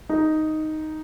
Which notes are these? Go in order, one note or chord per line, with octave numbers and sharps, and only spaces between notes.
D#4